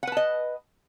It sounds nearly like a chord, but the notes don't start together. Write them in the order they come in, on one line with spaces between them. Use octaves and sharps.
F#5 B4 A5 D#5